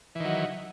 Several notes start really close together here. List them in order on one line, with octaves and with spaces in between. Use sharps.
E3 D#3 F#3